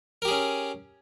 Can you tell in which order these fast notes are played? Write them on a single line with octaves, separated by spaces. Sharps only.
A#4 G4 G#4 C#4